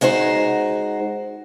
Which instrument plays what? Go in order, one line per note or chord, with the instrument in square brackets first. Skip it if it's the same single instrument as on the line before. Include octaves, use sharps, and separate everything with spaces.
[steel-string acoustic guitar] G#3 D#4 F#4 C5